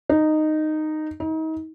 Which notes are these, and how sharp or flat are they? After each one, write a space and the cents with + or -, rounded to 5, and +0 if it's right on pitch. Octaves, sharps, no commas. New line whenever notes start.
D#4 -10
D#4 +35